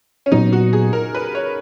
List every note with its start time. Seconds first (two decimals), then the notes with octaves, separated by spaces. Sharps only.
0.26 C#4
0.31 A#2 F#3 B3 D#4
0.53 F#4
0.73 G#4
0.93 A#4
1.15 B4
1.35 C#5